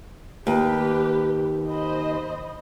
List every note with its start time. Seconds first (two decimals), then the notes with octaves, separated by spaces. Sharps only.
0.47 D#2 G4 B4
1.69 C5 D#5 B5